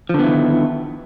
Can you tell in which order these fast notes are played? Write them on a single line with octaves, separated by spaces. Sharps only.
F3 D3 B3 E4 D#3